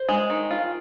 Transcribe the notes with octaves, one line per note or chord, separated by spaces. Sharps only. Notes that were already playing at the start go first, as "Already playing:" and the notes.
Already playing: C5
G#3
D#3
F4